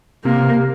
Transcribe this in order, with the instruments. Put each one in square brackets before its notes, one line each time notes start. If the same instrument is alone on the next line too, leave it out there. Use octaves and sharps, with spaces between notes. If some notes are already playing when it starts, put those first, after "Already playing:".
[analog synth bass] C3 [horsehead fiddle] A#3